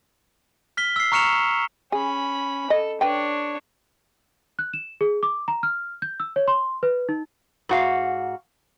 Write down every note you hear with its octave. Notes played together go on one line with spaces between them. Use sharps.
F6 B6 G7
E6 C7
A#5 C#6 F6 C#7 E7 F7
C#4 G#4 B5
A4 D#5
D4 B4 C#5 G5
F#6
E7
G#4
D6
A#5
F6
G6
E6
C#5
C6
B4
D#4
G#2 F#4 F5